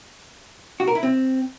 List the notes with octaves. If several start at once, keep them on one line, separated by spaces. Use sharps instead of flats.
F#4
A#4
E4
C4